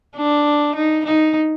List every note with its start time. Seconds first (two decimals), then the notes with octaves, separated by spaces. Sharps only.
0.17 D4
0.75 D#4
1.05 D#4